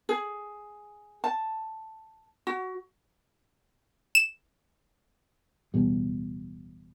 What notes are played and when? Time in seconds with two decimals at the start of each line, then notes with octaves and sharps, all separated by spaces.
0.09 G#4
1.24 A5
2.47 F#4
4.15 E7
5.74 D1 E2 B2 G3